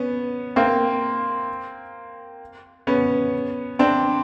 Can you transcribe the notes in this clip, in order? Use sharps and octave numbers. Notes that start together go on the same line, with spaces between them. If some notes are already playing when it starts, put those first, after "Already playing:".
Already playing: B3 C#4
A#3 C4
B3 C#4
C4 D4